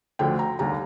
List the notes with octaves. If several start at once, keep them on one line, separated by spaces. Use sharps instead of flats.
D2 D3 F3 G5
A#5
D#2 D3 G3 A#5